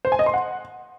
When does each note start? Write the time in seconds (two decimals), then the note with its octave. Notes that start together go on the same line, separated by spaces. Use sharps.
0.05 C5
0.12 G#5
0.19 D#5
0.26 C6
0.34 F#5